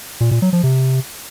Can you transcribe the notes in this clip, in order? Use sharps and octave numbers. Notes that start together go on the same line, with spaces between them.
A#2
A#2
F#3
F3
C3